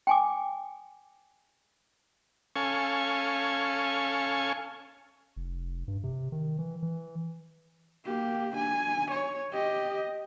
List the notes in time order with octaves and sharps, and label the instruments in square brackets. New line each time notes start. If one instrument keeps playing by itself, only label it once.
[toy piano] G5 G#5 D6
[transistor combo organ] C#4 A4 F5 G#5 C#6
[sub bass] F1
G2
C3
D#3
E3
E3
[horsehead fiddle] A#3 G4
D4 G#5
C#5
G4 D#5